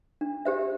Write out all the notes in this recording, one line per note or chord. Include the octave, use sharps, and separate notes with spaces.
D4
G4 C5 E5